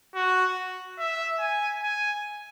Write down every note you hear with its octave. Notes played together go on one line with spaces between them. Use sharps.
F#4
E5
G#5
G#5